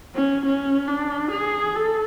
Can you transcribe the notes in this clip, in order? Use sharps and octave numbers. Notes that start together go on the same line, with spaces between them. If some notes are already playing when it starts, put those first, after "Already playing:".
C#4
C#4
D4
G#4
A4